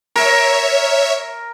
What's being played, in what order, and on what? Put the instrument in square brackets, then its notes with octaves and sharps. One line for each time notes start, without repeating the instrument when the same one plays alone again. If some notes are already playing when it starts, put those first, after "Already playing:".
[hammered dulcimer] A#4 [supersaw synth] C#5 E5